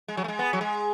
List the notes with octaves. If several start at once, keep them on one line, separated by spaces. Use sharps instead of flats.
G#3
F#3
A3
G#3
B3
F#3
G#3